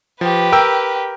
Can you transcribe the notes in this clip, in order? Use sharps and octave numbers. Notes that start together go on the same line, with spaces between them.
F3 G4 B4
A#4 G5 E6